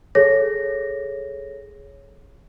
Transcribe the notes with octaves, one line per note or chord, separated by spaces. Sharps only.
G#4 A4 C#5 A#6